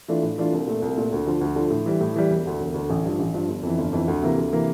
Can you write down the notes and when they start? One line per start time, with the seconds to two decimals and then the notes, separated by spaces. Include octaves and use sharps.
0.08 E3 A3 D4 F4
0.23 A2
0.38 E3 A3 D4 F4
0.52 C2
0.67 A#2 A3
0.82 C2
0.97 A#2 A3
1.12 D2
1.26 D3 F3
1.41 D2
1.56 D3 F3
1.70 A2
1.86 E3 G3
2.01 A2
2.16 E3 G3
2.30 E1
2.46 D2 D3
2.60 E1
2.74 D2 D3
2.90 A1
3.04 G2 F3
3.19 A1
3.34 G2 F3
3.48 G1
3.63 F2 E3
3.78 G1
3.93 F2 E3
4.08 D2
4.23 C3 E3 A#3
4.37 D2
4.53 C3 E3 A#3